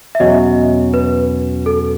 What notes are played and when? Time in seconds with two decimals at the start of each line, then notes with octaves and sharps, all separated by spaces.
0.15 E5
0.20 E2 B2 F#3 C#4 F#4 D#5
0.94 B4
1.66 A4